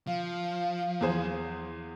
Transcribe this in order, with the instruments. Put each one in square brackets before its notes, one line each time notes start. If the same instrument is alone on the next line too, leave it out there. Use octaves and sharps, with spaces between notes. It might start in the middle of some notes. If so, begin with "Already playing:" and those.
[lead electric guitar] F3 [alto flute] F5
[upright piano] E2 G#4 C5